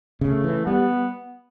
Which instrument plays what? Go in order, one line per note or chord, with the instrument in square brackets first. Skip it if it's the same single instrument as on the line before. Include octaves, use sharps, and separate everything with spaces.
[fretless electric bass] C#3 [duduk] A3
[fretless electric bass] E3
[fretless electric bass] G3 [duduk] B3